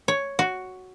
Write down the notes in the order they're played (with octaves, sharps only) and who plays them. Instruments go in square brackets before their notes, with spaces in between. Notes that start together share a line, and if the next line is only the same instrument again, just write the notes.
[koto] C#5
F#4